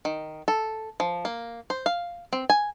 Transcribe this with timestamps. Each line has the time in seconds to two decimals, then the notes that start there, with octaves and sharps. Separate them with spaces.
0.05 D#3
0.48 A4
1.00 F3
1.25 A#3
1.70 C5
1.86 F5
2.33 C4
2.50 G#5